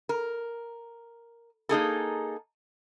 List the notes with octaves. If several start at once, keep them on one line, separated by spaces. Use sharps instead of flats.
A#4
A#3 D#4 G#4 A4